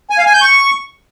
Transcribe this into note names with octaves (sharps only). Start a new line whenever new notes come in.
G#5
F5
G#5
G6
C#6